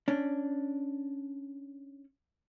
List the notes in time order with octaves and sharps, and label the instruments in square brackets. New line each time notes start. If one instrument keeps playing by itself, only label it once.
[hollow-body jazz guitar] C#4 D4